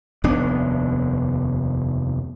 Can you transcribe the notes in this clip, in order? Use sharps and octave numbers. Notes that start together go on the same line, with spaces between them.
F1 D#2 B3 D4